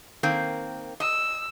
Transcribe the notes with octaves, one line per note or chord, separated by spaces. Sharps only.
D#3 A#3 C4
D#5 E6